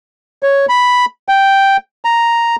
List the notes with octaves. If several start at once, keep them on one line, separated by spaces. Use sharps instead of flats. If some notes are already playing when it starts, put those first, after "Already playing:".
C#5
B5
G5
A#5